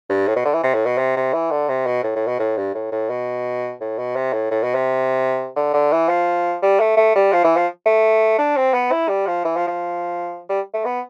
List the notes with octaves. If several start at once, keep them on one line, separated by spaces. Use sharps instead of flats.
G2
A2
B2
D3
E3
C3
A2
B2
C3
C3
E3
D3
C3
B2
A2
A2
B2
A2
G2
A2
A2
B2
A2
B2
C3
A2
A2
B2
C3
D3
D3
E3
F3
G3
A3
A3
G3
F3
E3
F3
A3
D4
C4
B3
E4
G3
F3
E3
F3
F3
G3
A3
B3